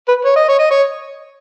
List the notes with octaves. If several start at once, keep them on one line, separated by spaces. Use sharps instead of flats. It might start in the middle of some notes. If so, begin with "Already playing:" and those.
B4
C#5
D#5
C#5
D#5
C#5